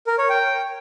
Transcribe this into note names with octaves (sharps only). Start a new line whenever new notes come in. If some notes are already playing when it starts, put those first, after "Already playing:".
A#4
C#5
G5